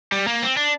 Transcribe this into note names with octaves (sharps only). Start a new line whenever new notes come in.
G3
A#3
C4
D4